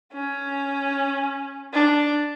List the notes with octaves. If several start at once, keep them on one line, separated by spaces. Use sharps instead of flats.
C#4
D4